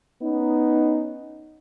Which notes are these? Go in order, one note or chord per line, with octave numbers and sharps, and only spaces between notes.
B3 C#4 D#4